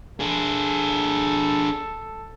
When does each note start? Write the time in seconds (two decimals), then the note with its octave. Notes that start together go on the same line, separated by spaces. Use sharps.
0.20 D4 G#4 A4